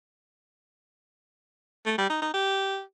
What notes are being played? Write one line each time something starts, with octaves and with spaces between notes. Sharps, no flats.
A3
G3
D#4
D#4
G4